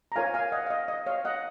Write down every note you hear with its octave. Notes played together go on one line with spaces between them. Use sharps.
A#5
F4 A#4 C#5 F5 G#5
F5 G#5
D#5 F#5
F5
D#5
D#5
C#5 F5
D#5 F#5